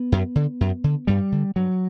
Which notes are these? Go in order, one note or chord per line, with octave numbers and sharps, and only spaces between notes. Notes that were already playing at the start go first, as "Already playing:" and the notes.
Already playing: B3
F#2
D3
F#2
D3
G2 G3
D3
G2 F#3